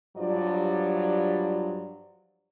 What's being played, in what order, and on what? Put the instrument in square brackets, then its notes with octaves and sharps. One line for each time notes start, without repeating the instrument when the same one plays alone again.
[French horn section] G2 F3 F#3 D5